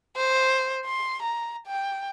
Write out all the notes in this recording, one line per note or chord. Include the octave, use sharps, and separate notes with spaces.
C5
C6
A#5
G5